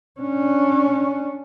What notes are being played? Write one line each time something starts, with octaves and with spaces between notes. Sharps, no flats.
C#4 D4